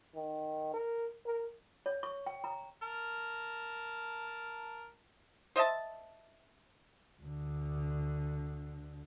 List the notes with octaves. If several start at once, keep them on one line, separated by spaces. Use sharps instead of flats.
D#3
A#4
A#4
C#5
C#6
G5
A#5
A#4 A5
C5 D#5 E5 A5
D2 D3